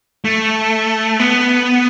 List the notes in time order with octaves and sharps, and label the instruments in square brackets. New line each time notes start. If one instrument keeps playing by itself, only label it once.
[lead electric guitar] A3
B3